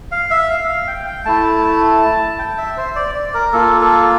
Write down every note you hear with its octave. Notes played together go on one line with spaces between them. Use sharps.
F5
E5
F5
F5
G5
G5
A3 E4 A5
G5
E5
C5
D5
D5
A#4
A#3 F4 A4
A4